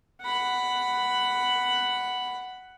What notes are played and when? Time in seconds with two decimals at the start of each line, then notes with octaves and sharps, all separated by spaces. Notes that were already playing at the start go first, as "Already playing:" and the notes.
0.21 F#5 B5